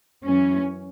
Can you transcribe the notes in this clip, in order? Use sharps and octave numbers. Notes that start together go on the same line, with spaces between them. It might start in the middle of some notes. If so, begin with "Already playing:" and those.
F#2 E3 C#4